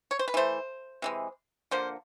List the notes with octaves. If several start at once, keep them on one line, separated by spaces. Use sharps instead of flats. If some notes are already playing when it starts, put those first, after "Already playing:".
C#5
C5
B4
E3 A3 C5
C3 E3 G#3
D3 F3 A#3 C5